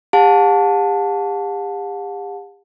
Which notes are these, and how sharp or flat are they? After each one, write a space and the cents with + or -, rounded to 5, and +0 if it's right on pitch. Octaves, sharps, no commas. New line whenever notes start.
G4 +45 F#5 -45 A5 +0